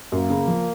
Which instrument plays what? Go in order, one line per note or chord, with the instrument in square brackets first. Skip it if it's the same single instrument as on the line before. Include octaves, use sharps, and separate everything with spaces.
[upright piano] F#2 [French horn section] A#3
[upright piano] C#3
F3